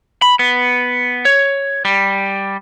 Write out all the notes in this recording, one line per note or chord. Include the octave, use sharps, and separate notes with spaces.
B5
B3
C#5
G3